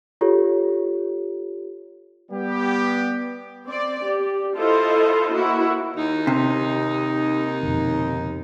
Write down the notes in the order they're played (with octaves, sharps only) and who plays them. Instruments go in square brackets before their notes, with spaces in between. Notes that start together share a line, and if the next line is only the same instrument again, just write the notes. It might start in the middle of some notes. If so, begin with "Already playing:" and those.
[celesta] F4 G4 A4 C#5
[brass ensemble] G3 B3 G4
[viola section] C4 D5
G4
E4 F4 A4 C5 D#5
A#3 E4 F#4
[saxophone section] D#2 D#4
[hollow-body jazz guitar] C3
[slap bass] F2 B2 D3